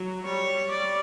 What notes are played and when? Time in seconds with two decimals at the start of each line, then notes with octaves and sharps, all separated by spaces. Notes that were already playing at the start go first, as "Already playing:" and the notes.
Already playing: F#3
0.25 G3 C#5
0.71 G3 D5